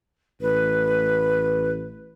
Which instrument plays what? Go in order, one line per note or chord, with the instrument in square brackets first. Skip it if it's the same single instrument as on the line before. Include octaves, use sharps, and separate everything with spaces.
[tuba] A1 [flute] B4